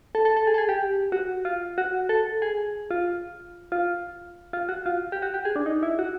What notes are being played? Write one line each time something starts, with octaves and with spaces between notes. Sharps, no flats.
A4
A4
A4
G#4
A4
G#4
G4
F#4
F4
F#4
A4
G#4
F4
F4
F4
F#4
F4
G4
F#4
G4
G#4
D4
D#4
E4
F#4